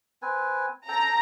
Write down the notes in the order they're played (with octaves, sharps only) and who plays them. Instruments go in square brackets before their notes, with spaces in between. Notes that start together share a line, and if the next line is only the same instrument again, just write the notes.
[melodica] C4 B4 G#5
[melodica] A4 G5 [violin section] A#5